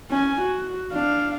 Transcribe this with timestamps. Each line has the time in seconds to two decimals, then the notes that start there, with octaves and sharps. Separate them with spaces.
0.10 C#4 G#5
0.42 F#4
0.93 D4 F5